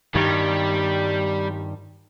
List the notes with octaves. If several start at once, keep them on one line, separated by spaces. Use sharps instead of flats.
G2 D#3 G3